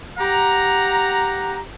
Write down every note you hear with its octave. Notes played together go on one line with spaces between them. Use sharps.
G4 F#5 A#5